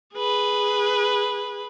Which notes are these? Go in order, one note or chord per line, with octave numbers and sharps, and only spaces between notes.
G#4 B4